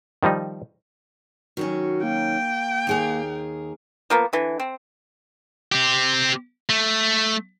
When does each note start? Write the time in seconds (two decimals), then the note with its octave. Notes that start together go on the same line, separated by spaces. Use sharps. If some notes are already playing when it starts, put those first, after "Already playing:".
0.23 D#3 F3 G3 D#4
1.57 D#3 F#3 C#4 F#4
2.03 A#3 G5
2.87 D#2 G#4 A#4
4.10 F3 A#3 B3
4.33 D3 E3
4.60 C4
5.72 C4 G4
6.69 A3